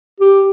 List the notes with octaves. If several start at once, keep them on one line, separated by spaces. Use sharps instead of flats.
G4